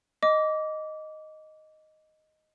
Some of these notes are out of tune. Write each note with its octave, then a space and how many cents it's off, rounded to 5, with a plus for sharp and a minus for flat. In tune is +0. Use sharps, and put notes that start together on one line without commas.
D#5 +0 D6 -20